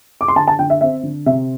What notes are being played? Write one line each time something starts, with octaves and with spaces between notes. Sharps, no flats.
D6
C6
D3 A5
A5
D3 G5
E5
C4 E5
D3
C3 E5